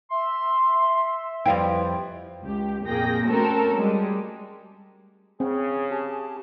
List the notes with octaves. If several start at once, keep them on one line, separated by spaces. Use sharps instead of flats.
E5 C6
F2 G3 E4 B4 F5 G5
C#2 G4
F2 A#2 A#3 G#4 G5 A#6
A3 C4 C#4 F#4 A4 A#4
G3 G#3
C#3 C4 G#4
G4 A5